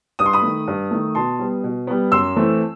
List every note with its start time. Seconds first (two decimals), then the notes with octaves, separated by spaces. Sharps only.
0.19 G2 D#6
0.26 C6
0.33 B5 D#6
0.42 D#3 A3
0.67 G2
0.91 D#3 A3
1.15 B2 A5 C6
1.39 G3 B3
1.64 B2
1.87 G3 B3
2.12 F#2 C6 E6
2.36 E3 A3 C4